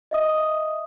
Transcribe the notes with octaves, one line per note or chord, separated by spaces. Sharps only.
D#5 E5 D#6